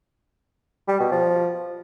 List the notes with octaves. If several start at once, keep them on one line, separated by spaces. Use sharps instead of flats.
G3
B2
F3